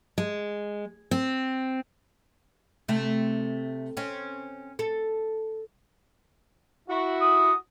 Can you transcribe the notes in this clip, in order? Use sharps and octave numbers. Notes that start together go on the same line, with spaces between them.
G#3
C4
C3 A3
C4 C#4
A4
E4 F#4
D#6